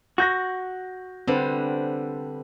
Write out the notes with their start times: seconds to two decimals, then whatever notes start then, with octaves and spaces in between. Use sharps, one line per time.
0.18 F#4 C#6 G6 A#6
1.27 D3 G3 C4 B4 C5